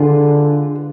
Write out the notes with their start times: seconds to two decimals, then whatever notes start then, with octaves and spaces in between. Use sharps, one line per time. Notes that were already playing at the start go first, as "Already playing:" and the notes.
Already playing: D3 G#3 F4 B4